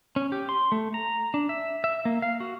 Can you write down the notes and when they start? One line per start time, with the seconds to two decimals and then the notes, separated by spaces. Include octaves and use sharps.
0.16 C#4
0.32 G4
0.49 C6
0.72 A3
0.94 A#5
1.34 D4
1.49 E5
1.84 E5
2.05 A#3
2.22 F5
2.40 F#4